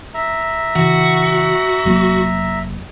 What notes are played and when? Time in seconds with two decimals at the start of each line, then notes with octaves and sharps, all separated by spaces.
0.14 E5 A#5
0.76 C#3 E3 F#4
1.85 F1 F#3 A#3